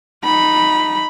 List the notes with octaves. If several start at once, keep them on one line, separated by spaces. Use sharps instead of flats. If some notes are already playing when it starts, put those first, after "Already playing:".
D#4 B5